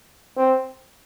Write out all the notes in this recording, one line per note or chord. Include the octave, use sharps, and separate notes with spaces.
C4